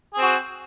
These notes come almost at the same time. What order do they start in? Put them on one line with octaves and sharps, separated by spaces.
G#4 C4 F#4